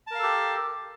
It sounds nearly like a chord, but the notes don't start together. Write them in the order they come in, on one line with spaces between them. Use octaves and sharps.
A5 A#4 F5 A4 G4